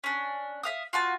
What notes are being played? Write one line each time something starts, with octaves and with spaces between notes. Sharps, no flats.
C#4 D4
E5 F5 D#6
F4 F#4 A5